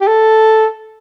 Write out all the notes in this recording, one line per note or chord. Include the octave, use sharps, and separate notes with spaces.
G4
A4